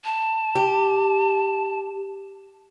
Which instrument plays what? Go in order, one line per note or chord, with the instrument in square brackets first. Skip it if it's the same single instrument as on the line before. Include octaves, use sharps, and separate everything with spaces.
[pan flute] A5
[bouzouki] G4